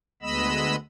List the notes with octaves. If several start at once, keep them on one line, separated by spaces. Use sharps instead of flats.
D2 G#3 B3 D#5 B5 E6